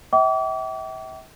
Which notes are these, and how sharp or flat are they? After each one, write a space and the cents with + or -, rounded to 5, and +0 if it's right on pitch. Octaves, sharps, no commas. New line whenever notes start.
E5 -35 G5 -40 D6 -40